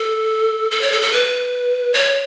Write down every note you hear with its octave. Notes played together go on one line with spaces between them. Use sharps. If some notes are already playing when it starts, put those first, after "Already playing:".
Already playing: A4
A4
C#5
A4
A4
B4
C#5